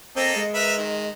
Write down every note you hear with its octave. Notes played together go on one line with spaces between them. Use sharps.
A#3 C4 A4 D#5
G#3
A#4 B4 E5
D#3